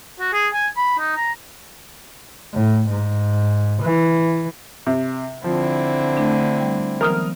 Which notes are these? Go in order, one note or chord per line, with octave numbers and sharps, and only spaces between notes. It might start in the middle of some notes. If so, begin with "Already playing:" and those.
F#4
G#4
G#5
B5
D#4
A#5
A2
G#2
E3
C3
D3 F3 C4 E4
A3 D4
G3
E3 F#3 B3 A#4 D#6 F6